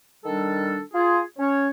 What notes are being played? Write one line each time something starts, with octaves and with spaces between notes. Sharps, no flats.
D#3 G3 D4 A4
F4 G#4
C#4 C#5